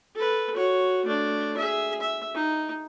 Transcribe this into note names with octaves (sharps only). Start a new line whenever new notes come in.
A4 B4
F#4 C#5
A3 D4
G#4 E5
E5
D#4